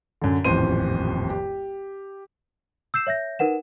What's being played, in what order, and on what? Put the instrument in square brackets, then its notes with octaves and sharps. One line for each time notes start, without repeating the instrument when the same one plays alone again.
[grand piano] F#2 D3
D#1 A1 F2 C5 D#7
G4
[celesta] E6 G6 C7 E7
C#5 E5 G6 A#6
D#4 A#4 B4 F#5 E7